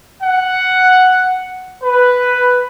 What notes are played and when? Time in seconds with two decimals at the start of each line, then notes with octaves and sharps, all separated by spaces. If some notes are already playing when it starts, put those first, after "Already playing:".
0.23 F#5
1.83 B4